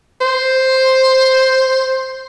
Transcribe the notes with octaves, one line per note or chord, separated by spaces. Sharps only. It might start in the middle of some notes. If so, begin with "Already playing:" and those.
C5